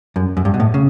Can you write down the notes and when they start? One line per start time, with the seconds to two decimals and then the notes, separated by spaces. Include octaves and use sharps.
0.16 F#2
0.37 F#2
0.45 G2
0.54 B2
0.60 A2
0.74 C#3